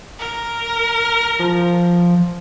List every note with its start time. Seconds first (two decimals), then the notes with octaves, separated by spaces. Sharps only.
0.19 A#4
1.39 F3